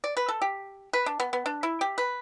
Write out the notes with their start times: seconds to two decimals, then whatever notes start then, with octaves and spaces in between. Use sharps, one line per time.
0.04 D5
0.17 B4
0.28 A4
0.42 G4
0.93 B4
1.06 D4
1.20 B3
1.33 B3
1.46 D4
1.63 E4
1.81 G4
1.98 B4